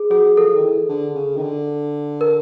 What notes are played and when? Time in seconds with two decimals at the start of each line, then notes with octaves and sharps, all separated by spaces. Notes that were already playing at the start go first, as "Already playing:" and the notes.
Already playing: G#4
0.10 F#3 G#4
0.26 F#3
0.37 F3 A4
0.56 D#3
0.63 E3
0.89 D3
1.15 C#3
1.37 D#3
1.42 D3
2.21 A#4